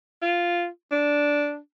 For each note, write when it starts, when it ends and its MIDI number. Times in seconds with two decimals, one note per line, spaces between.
0.22 0.67 65
0.92 1.58 62